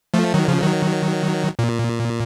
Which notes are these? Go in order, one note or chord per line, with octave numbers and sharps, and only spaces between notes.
F3 A3
D#3 F#3
C#3 F3
D#3 F#3
A#2